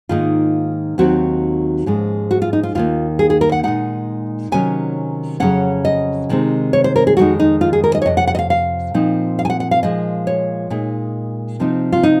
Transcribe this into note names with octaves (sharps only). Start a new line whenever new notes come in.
G#2 D#3 A#3 D#4 F4
D#2 D#3 F#3 C4 F#4
G#2 F3 G#3 C#4
F#4
F4
D#4
F4
D#2 D#3 A#3 F4
G#4
G#4
A#4
F#5
A#2 G#3 D#4 F#5
C3 D#3 F#3 C#4 G#5
F2 C#3 F#3 C#4 F#5
D#5
C3 D#3 G#3 C4
C#5
C5
A#4
G#4
F2 D#3 G#3 D#4 F#4
D#4
F4
G#4
A#4
D#5
C#5
F2 C3 D#5
F#5
F#5
D#5
F5
F5
A#2 F3 C4 D#4
F5
G#5
F#5
F#5
F5
A#2 F3 G#3 D#5
C#5
A#2 G#3 D#4
C3 F3 C4 D#4
F4
D#4